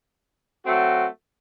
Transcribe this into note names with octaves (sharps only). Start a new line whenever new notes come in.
F#3 A3 C4 F#4